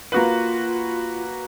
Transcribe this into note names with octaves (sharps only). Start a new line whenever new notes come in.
A#3 F4 F#4 B4